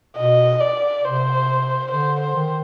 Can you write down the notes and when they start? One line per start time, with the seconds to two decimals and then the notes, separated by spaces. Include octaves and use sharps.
0.17 B2 D#5
0.61 D5
1.04 C3 C5
1.91 D3 C5
2.21 C5
2.35 D#3